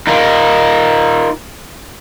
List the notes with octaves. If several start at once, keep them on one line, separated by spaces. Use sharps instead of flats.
D#4 F4 A#4